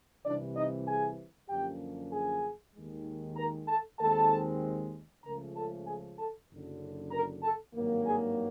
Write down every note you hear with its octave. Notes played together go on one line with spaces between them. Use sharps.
C2 C3 E3 D4 D5
D#4 D#5
G#4 G#5
F#2 D3 F3 A#3 C#4 G4 G5
G#4 G#5
D#2 D#3 G#3
A#4 A#5
A4 A5
D#2 D#3 G#3 C4 A4 A5
C#2 C#3 F3 A3 C#4 A#4 A#5
A4 A5
G#4 G#5
A4 A5
F#1 F#2 D3
A#4 A#5
A4 A5
G#1 G2 D#3 F#3 A#3
G#4 G#5